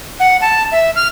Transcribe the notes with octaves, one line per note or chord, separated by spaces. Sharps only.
F#5
A5
E5
F6